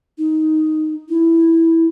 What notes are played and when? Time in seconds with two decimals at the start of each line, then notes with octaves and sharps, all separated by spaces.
0.18 D#4
1.09 E4